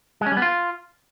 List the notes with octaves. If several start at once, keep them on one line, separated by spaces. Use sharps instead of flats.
G#3
C#4
G3
B3
F4